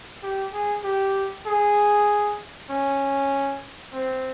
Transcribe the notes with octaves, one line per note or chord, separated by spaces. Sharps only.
G4
G#4
G4
G#4
C#4
C4